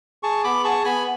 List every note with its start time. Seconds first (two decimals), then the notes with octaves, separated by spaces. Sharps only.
0.23 G#4 A5 C#6
0.44 B3 B5 D6
0.64 G#4 A5 C#6
0.84 B3 G#5 B5